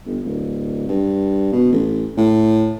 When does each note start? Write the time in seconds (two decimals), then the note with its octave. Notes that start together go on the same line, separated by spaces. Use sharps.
0.06 G1
0.25 D1
0.88 G2
1.53 B2
1.72 A1
2.18 A2